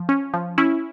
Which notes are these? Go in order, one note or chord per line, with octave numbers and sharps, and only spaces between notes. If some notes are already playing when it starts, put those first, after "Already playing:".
Already playing: F3
C#4
F3
C#4 E4